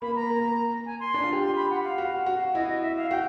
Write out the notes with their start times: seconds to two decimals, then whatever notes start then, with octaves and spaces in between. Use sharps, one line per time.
0.02 A#3 B5
0.16 A#5
0.30 A#3
0.86 G#5
1.00 C6
1.14 D4
1.24 F4
1.33 G4
1.42 C6
1.56 B5
1.70 F#5
1.84 F5
1.98 F#4
2.26 F#4
2.55 E4 D#5
2.69 D#5
2.83 E5
2.97 F5
3.11 F#4 G5